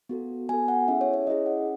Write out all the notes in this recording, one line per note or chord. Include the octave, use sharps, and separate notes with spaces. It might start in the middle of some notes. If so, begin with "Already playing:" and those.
B3 F#4 A4
B3 F#4 A4 G#5
F#5
C#4 E4 G#4 E5
C#5
C#5
C#4 E4 G#4 D#5
F#5